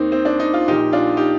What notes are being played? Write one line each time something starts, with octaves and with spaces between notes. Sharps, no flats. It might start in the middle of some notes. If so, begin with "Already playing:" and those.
Already playing: D#2 D#3 C4 D#4
C4
D4
D#4
F4
A#1 A#2 D#4 G4
D4 F4
D#4 G4